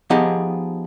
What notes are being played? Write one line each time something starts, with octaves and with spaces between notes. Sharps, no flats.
F3 B3 D#4 G4 G#4